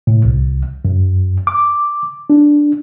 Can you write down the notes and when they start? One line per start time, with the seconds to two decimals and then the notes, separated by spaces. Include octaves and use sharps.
0.07 A2
0.25 C2
0.85 F#2
1.47 D6
2.30 D4